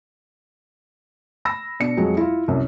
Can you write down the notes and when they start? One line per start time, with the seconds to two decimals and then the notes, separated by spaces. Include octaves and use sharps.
1.45 B5 E6 A#6
1.80 B2 D4 C#7
1.97 F2 F#3 G#3
2.17 E4 F4
2.48 C2 F#2